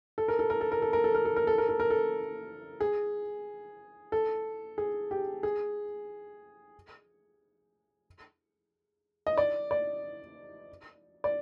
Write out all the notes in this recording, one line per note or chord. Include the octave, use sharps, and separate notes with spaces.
A4
A#4
A4
A#4
A4
A#4
A4
A#4
A4
A#4
A4
A#4
A4
A#4
A4
A#4
A4
G#4
A4
G#4
G4
G#4
D#5
D5
D5
D5